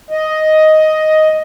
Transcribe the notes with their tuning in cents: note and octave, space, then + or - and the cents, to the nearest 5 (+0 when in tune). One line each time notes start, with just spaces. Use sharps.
D#5 +5